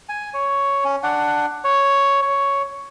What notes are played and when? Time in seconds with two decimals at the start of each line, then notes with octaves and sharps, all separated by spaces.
0.09 G#5
0.34 C#5
0.84 C#4
1.03 D4 F#5
1.64 C#5
2.22 C#5